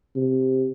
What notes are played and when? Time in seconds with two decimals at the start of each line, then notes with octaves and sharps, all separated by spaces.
0.16 C3